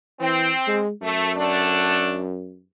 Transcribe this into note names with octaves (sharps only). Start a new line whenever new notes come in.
E3 C4
G#3
F#2 A3
D3 A3 D4